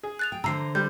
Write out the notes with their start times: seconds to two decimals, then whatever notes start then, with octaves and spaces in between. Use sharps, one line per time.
0.03 G#4
0.19 F#6 A6 F7
0.32 G5
0.44 D3 E3 C5 A#5 E6 C7
0.75 G3 G6